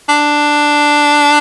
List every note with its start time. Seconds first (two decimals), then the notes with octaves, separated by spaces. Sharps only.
0.09 D4